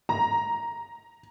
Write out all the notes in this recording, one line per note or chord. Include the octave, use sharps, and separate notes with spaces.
A#5